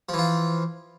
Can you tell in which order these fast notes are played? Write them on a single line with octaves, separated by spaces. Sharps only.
F3 E3 F4